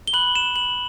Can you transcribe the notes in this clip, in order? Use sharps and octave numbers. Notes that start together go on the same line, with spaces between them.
G7
B5 F#6 F#7
E7
F#7